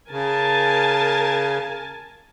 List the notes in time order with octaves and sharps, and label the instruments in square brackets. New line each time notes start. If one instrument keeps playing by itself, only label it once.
[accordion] C#3 [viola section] A#4 G#5 A5